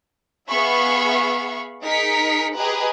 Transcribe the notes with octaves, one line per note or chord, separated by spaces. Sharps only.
B3 G#4 E5 F5 B5 C#6
D#4 G#4 A#4 D#5 B6 C#7
G4 G#4 B4 D#5 G#5 A#5